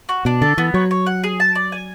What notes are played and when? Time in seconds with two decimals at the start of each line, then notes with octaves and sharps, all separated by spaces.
0.09 F#4
0.25 B2 D4
0.41 D3 A4
0.57 E3 B3
0.74 F#3 C#5
0.91 C#5
1.06 F#5
1.24 G#4
1.40 A5
1.55 D5
1.72 G#5